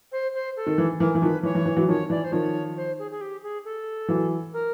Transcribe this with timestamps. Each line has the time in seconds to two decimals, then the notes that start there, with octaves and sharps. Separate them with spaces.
0.11 C5
0.34 C5
0.56 A4
0.66 D#3
0.78 E3
1.00 E3 A#4
1.15 E3
1.22 D#3 F3 B4
1.43 E3 C#5
1.55 E3
1.66 E3
1.76 E3 F#3
1.88 D#3 F3 C#5
2.10 E3 D5
2.23 C5
2.32 D#3 F3 C#5
2.76 C5
2.98 G#4
3.10 G#4
3.20 G4
3.42 G#4
3.64 A4
4.08 E3 F#3
4.53 A#4